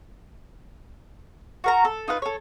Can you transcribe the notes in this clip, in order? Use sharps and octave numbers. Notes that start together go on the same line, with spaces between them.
F#4 A#4 A#5
A4
D#4 F4 B4
A4 C#5